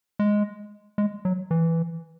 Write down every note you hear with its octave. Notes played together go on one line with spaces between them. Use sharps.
G#3
G#3
F#3
E3